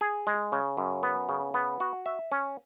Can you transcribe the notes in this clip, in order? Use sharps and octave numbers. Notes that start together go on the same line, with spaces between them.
G#4
G#3
C#3
F#2
B3
C#3
B3
F#4
E5
C#4